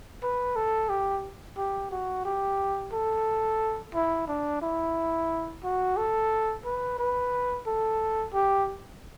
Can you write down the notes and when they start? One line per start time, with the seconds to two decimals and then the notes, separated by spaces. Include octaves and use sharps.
0.23 B4
0.56 A4
0.90 G4
1.57 G4
1.91 F#4
2.25 G4
2.93 A4
3.94 E4
4.28 D4
4.62 E4
5.64 F#4
5.97 A4
6.65 B4
6.99 B4
7.67 A4
8.34 G4